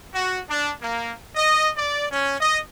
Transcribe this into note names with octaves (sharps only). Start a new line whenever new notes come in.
F#4
D4
A#3
D#5
D5
C#4
D#5